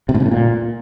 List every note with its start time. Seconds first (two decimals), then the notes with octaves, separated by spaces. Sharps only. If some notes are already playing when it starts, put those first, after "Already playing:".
0.09 C3
0.14 A2
0.20 C#3
0.26 A2
0.31 A#2